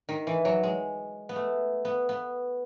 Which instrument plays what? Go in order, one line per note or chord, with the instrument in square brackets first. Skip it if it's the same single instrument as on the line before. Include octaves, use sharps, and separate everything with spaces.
[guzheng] D#3
E3
F#3
G#3
B3
A3
B3
B3